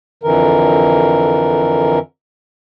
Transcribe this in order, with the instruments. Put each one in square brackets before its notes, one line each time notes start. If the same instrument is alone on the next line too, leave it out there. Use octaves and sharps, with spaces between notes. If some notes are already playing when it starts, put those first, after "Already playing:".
[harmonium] F2 D3 E3 A#4